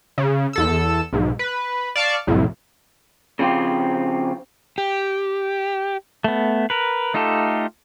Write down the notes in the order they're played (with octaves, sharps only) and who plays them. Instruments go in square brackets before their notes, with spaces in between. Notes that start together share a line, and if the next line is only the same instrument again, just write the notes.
[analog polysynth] C#3
E2 A4 E6
B1 G#2
B4
D5 F5 A5 C#6
C2 F2 A2
[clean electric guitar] C#3 F3 C4 F4 G4
[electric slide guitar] G4
[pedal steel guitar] A3 B3
A#4 B4
A3 D#4 F4 G4 A4